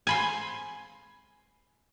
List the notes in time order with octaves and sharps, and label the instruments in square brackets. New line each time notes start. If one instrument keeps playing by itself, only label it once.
[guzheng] G#5 B5 C6